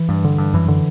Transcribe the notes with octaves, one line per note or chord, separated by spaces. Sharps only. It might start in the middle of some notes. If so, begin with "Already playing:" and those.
Already playing: E3
G2
D3
G2
F#2 E3
D3